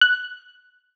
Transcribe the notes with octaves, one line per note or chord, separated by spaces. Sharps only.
F#6